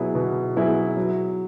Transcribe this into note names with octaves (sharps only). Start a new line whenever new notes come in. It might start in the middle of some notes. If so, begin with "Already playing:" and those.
Already playing: B2 F#3 B3 E4 G#4
B2
F#3 B3 E4 G#4
F#3